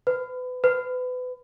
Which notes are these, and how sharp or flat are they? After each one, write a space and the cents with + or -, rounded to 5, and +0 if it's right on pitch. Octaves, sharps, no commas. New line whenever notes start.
B4 +30
B4 +30